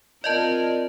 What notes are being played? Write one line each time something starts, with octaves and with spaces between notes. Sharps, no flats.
C4 F4 A#4 D5 D#5 A5